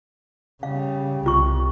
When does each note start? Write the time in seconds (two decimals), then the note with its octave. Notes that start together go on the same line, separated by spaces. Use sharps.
0.63 C#3 G3 F5
1.26 C2 F4 C#6